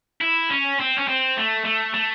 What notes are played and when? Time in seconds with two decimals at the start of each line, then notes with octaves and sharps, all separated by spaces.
0.21 E4
0.50 C#4
0.79 C4
0.98 C#4
1.08 C4
1.37 A3
1.65 A3
1.94 A3